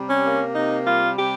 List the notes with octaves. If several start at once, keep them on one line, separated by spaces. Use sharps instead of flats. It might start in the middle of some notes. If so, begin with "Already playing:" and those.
Already playing: C3 G3
C#4
A#3
C3 D#4
G3 F4
C3 G4